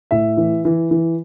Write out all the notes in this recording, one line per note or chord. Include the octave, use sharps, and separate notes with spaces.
A2 E5
E3
E3
E3